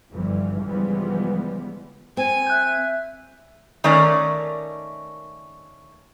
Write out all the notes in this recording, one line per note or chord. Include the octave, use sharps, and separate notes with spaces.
G1 G2 D3 E3 F3 G3
C#3 E3 F3 G3 G#3 B3
C4 G#5
E5 F#6 G6
D#3 A3 C#4 A#4 D5